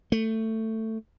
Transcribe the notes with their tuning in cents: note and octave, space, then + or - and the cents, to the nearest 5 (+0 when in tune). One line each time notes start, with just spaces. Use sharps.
A3 +15